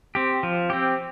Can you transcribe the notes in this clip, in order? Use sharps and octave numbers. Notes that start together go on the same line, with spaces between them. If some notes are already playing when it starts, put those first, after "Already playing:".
C4 G4
F3
C4 G4